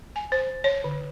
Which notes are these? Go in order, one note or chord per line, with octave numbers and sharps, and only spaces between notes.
G#5
C5
C#5
D3